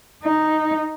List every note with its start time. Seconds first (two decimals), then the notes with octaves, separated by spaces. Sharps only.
0.24 D#4